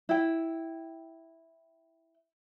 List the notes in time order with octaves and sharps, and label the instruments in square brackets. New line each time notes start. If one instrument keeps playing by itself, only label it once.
[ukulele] E4 G5